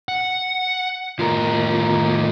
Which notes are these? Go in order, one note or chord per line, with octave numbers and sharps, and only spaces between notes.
F#5
D#2 A2 F4 A#4